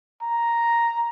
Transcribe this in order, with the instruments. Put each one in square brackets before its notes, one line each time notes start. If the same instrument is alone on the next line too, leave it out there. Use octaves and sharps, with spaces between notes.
[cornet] A#5